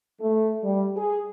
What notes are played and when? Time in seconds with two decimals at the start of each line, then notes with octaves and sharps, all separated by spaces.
0.21 A3
0.63 G3
0.96 G#4